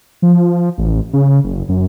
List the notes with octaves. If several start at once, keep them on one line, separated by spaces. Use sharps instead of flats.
F3
A1
C#3
F#1
F#2